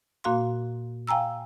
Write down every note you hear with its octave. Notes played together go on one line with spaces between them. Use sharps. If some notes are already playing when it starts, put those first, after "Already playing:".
A#2 A#3 F#4 F5 C6
F5 G5 G#5 A#5 E6